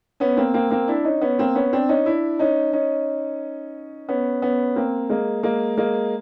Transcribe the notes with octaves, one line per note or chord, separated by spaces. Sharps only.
B3 C#4
A#3 C4
A#3 C4
A#3 C4
D4 E4
C#4 D#4
B3 C#4
A#3 C4
B3 C#4
C4 D4
C#4 D#4
D4 E4
C#4 D#4
C#4 D#4
B3 C#4
B3 C#4
A#3 C4
G#3 A#3
G#3 A#3
G#3 A#3